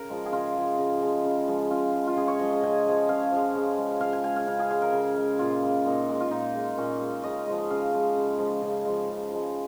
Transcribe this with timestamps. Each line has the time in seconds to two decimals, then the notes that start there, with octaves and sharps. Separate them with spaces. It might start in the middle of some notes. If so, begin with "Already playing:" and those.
Already playing: C#3 A#4
0.09 F3 G#3
0.26 G#4
0.32 C#3 F4
0.56 F3 G#3
0.78 C#3
1.02 F3 G#3
1.25 C#3
1.47 F3 G#3
1.70 C#3 F4
1.93 F3 G#3
2.07 F4
2.16 C#3 G#4
2.28 C#5
2.39 F3 G#3 D#5
2.51 D#5
2.63 C#3 G#5
2.86 F3 G#3
3.09 C#3 F5
3.31 F3 G#3
3.55 C#3
3.78 G#3
4.00 C#3 F5
4.13 G#5
4.23 G#3 G#5
4.36 F5
4.47 C#3 F5
4.59 G#4
4.70 G#3 G#4
4.82 A#4
4.93 C#3
5.16 G#3
5.39 A#2 F4
5.62 G#3
5.86 A#2 D#4
6.09 G#3
6.20 F4
6.31 A#2 D#4
6.55 G#3
6.77 A#2 C#4
7.00 G#3
7.24 C#3 D#5
7.47 F3 G#3
7.70 C#3 F5
7.92 F3 G#3
8.16 C#3
8.38 F3 G#3
8.62 C#3
8.85 F3 G#3
9.09 C#3
9.31 F3 G#3